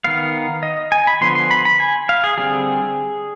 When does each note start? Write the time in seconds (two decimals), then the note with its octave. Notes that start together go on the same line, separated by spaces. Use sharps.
0.04 D#3 B3 F5
0.63 D#5
0.92 G#5
1.07 B5
1.21 D3 F3 B3 C6
1.35 C6
1.51 B5
1.65 B5
1.80 G#5
2.09 F5
2.24 G#4
2.38 D3 G3 C4 G#4